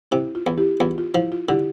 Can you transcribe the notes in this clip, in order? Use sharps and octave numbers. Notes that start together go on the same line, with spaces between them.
C3 E4
F4
E2
E4 G4
E2 F4
F4
F3 E4
F4
D3 E4 G4